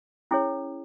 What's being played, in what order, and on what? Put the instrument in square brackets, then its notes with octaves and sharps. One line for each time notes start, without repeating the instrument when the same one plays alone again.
[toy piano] C#4 E4 G#4 C#5